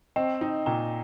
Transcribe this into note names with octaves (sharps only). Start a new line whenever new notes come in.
C4 D#5 G5
D#4
A#2 G5 A#5